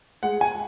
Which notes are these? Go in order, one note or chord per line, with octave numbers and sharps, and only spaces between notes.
G#3 F#5
G#5